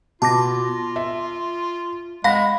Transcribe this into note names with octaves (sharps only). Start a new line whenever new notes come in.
B2 F4 A5 D6 A#6
E5
G#3 F5 F#5 B5 A#6